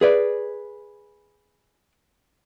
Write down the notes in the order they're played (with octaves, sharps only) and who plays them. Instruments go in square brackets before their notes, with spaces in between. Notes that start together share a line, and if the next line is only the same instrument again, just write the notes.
[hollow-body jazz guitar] G#4 B4 D5